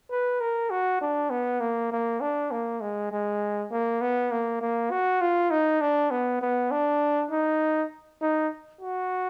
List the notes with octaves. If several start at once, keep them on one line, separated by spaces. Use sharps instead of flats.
B4
A#4
F#4
D4
B3
A#3
A#3
D4
A#3
G#3
G#3
A#3
B3
A#3
A#3
F#4
F4
D#4
D4
B3
B3
D4
D#4
D#4
F#4